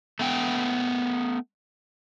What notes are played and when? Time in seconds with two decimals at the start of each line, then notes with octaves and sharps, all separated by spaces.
0.19 A3 B3 G5